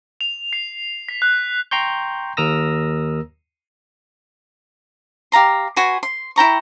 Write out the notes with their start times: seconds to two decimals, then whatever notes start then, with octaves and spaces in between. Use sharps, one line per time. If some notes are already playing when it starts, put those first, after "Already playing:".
0.21 F7
0.53 C7
1.09 B6
1.22 F#6
1.71 G5 A#5 C6 C#6 G6
2.37 D#2 A#4 A#5 D#6 E6 A#6
5.32 G4 F5 A#5 C6
5.76 F#4 B4 G#5 C6
6.03 C6
6.36 E4 G5 A#5 C#6